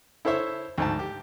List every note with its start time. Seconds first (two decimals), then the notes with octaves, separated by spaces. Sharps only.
0.25 E4 A4 C5 C#5 E5
0.78 D2 G#2 A5
0.99 G4